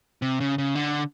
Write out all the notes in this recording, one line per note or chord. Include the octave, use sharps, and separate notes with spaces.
C3
C#3
C#3
D3